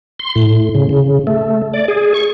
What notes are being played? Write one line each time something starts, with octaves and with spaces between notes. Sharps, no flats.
C6
A2
C#3
C#3
A3
D5
G#4
C#6